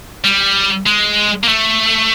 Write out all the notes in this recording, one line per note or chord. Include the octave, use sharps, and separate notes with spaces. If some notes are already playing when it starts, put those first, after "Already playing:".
G3
G#3
A#3
A3